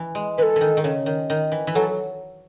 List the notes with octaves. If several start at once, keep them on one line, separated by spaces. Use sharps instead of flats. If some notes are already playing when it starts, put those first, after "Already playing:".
Already playing: E3
G#3
E3 A4 B4
D#3 E3
D#3
C#3
D#3
D#3
E3
E3
F#3 A4